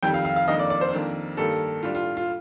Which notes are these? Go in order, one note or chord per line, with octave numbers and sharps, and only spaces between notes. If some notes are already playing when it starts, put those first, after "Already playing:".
F2 D#3 G3 G5
F5
F5
F5
F2 D#3 A#3 D4 D#5
D5
D5
C5
F2 D#3 A#3 D4
G2 D#3 G3 A#3 A4
A2 G3 D4 F4
F4
F4